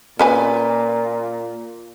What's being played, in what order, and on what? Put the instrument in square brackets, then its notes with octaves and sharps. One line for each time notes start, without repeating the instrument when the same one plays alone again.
[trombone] A#2 [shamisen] C#4 B4 G#5